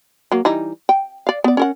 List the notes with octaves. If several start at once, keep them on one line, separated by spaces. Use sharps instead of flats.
F#3 A#3
E3 G3 D#4
G5
D5 F5
B3 D5
C#4 A#4 F#5